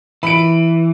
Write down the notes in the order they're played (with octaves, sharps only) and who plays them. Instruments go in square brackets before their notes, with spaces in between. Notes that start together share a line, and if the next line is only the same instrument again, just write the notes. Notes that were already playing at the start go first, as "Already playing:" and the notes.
[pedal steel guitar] E3 [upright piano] B5 D7